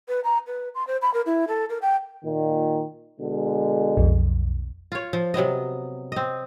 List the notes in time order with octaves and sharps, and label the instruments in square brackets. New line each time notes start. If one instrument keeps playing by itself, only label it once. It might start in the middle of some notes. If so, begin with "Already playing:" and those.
[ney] B4
A#5
B4
C6
C5
B5
A#4
E4
A4
A#4
G5
[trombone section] A#2 D#3
B2 D3 G#3
[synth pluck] B1 F2
[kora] F4 C#5
F3
C3 F#3 B3 D#5
C4 D#5